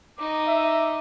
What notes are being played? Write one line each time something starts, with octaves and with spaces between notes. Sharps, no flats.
D#4 D#5 D6
E5